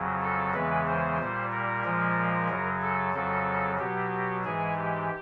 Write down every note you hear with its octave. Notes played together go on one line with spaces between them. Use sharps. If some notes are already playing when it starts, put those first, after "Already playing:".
Already playing: F2 C#3 F#3
A4
E2 C#3 E3 G#3 B4
C5
A#2 G3
A#4
A#2 F3 G#3
F#2 C#3 F#3
A4
F2 C#3 F#3 A4
B2 F#3 G4
G#2 E3 G#3 G#4
G4